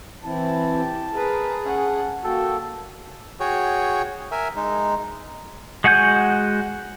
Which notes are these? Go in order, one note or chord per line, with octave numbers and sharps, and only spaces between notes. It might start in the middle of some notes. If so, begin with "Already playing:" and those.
E3 C4 E4 A5
G4
G#4 A#4 B4
C#4 F#5
A#3 F#4 A4 G5
F#4 G#4 C#5 G5
A#4 E5 G#5
G#3 D#4
G#3 F#4 F#5 G#5 G6